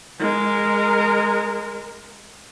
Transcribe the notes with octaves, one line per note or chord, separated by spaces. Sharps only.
G#3 A#4